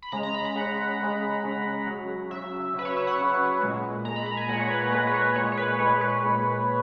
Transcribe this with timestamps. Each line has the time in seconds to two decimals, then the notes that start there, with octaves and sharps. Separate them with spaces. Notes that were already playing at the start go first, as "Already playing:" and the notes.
0.02 B5
0.12 C#3 G#3 A#5
0.23 A#5
0.34 B5
0.45 A#5
0.56 C#3 G#3 F#5
1.00 C#3 G#3
1.44 C#3 G#3
1.87 C#3 F#3
2.30 C#3 F#3 E5
2.74 C#3 F#3 B4
2.85 C#5
2.97 E5
3.07 F#5
3.17 C#3 F#3
3.61 A#2 G#3
4.05 A#2 A#5
4.09 G#3
4.16 B5
4.26 A#5
4.37 G#5
4.49 A#2 G#3 F#5
4.60 C#5
4.70 B4
4.81 C#5
4.92 A#2 G#3 B4
5.07 B4
5.14 C#5
5.36 A#2 G#3 C#5
5.52 C#5
5.57 B4
5.79 A#2 G#3 C#5
6.01 B4
6.23 A#2 G#3